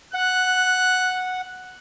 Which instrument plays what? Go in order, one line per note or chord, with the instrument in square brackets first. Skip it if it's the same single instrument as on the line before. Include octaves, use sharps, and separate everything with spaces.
[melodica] F#5 [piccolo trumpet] F#6